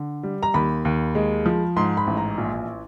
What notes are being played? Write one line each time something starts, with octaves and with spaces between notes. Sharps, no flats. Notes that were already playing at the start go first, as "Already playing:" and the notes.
Already playing: D3
G3
A#5
D#2 B5
D#2
G#3
F3
G#2 C6
B5
A1
A#5
A#1